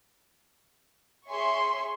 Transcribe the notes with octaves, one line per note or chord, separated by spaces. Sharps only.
G#4 C#5 E5 C6 C#6